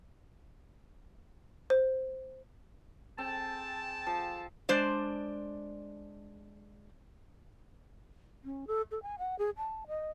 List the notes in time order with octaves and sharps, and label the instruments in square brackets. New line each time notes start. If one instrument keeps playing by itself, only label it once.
[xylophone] C5
[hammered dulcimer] C4 [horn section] G#4 G5 A5
[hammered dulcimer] F3
[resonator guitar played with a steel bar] G#3 D4 C5 D5
[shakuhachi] C#4
A4
A4
G#5
F#5
G#4
A5
D#5